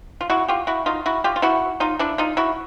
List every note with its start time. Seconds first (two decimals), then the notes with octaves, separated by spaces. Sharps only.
0.21 F4
0.30 E4 F#4
0.48 F4 G4
0.67 E4 F#4
0.86 D#4 F4
1.06 E4 F#4
1.24 F4 G4
1.36 F4
1.42 E4 F#4
1.80 D#4 F4
1.99 D4 E4
2.18 D#4 F4
2.37 E4 F#4